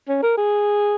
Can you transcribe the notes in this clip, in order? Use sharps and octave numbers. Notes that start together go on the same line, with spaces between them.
C#4
A#4
G#4